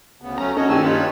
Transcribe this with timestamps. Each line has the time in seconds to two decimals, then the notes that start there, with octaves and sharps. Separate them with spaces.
0.22 D2 C#3 B3
0.38 F#3 A3 C#4 A#5
0.57 C#4 F#4 A4 C#5 D#5
0.69 G2 D#3 C4 G4 G#5 E6
0.84 D#4 F4 B4 C#5